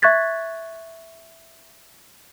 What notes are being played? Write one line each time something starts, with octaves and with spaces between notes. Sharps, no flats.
E5 C#6 F#6 G#6 A6 B6